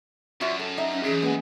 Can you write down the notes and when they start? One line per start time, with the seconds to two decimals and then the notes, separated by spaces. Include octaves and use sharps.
0.41 F#2 F4 F#4 E5
0.59 A4
0.78 D#4 E5
0.91 C#4
1.04 F#2 E3 C#4 G#4
1.22 G#3 A#3 B3 C#4 B4